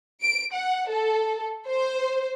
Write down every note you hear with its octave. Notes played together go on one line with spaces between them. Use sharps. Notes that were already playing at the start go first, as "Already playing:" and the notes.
D7
F#5
A4
C5